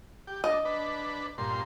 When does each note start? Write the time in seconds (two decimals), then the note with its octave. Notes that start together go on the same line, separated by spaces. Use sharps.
0.27 G4
0.44 D4 D#5
0.65 D4 B4
1.38 G2 A#2 C6